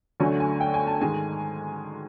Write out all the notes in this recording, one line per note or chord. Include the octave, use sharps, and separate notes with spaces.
D2 D3 F#3 A3 G#5
G#5
G5
G#5
A5
G#2 D#3 G#3 G#5